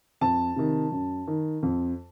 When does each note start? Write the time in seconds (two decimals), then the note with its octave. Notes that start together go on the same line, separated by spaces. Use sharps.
0.21 F2 A5
0.56 C3 D#3
0.92 F#2
1.27 D#3
1.63 F2